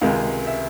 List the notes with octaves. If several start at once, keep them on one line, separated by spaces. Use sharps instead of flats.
C#2 C3 D#3 G#3 F5
E5